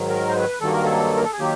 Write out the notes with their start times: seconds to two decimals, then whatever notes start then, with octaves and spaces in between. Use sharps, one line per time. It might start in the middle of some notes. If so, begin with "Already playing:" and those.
Already playing: G#2 D#3 F#3
0.09 A#4
0.28 C5
0.36 B4
0.61 G2 D#3 F#3 A#3 A4
0.73 A#4
0.84 A4
1.16 A#4
1.24 A4
1.32 G#4
1.39 D#3 F#3 A#3 G4